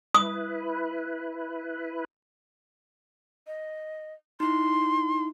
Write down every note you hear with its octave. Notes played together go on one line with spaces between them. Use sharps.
E4 B4 D#6
D#5
D#4 E4 C6